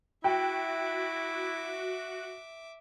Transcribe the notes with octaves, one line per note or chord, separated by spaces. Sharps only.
E4 F#4 E5 G5 D6